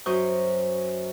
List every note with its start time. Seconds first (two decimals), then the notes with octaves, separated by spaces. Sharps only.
0.06 F#2 C5 C#6 D#6 G6